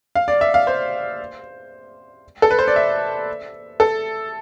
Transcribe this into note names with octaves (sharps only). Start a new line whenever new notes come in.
F5
D5
E5
F5
C5
A4
B4
C5
D5
E5
A4